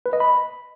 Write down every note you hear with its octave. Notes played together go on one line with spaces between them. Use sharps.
B4
D#5
B5